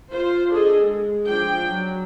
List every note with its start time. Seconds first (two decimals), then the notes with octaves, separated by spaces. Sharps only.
0.12 F4 C5
0.50 D4 G#4 A4 D#5
0.81 G#3
1.29 F3 D4 G5
1.68 F#3